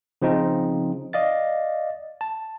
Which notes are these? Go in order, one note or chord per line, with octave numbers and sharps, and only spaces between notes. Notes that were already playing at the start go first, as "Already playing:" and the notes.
C#3 F3 C4 D#4
D5 D#5 F5 A6
A5